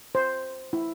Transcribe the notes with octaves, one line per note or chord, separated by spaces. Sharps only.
C5
E4